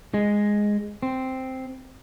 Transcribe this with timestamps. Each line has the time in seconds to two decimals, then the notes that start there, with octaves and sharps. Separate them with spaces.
0.14 G#3
1.03 C4